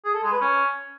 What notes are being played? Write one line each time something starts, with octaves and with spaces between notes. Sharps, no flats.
G#4
A4
G#3
B4
C#4